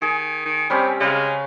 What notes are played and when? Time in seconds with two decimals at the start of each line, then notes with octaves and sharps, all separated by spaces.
0.02 D#3 G#4
0.45 D#3
0.70 C3 G3 C4 C#4
1.00 C#3 G#3 F5